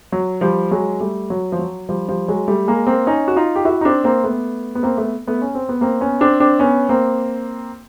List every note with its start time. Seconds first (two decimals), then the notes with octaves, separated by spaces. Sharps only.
0.12 F#3
0.41 F3 G3
0.71 F#3 G#3
1.00 G3 A3
1.30 F#3
1.52 F3
1.59 F#3
1.89 F3 G3
2.08 F3 G3
2.28 F#3 G#3
2.48 G3 A3
2.67 G#3 A#3
2.87 A#3 C4
3.07 C#4 D#4
3.28 F#4
3.36 D#4 F4
3.56 G4
3.65 E4 F#4
3.81 D#4
3.85 C4 D4
4.04 A#3 C4
4.24 A3 B3
4.75 B3
4.83 A#3 C4
4.98 A3 B3
5.27 A3 B3
5.42 C#4
5.55 C4
5.69 B3
5.81 A#3 C4
6.01 B3 C#4
6.21 C4 D4
6.40 C4 D4
6.59 B3 C#4
6.89 A#3 C4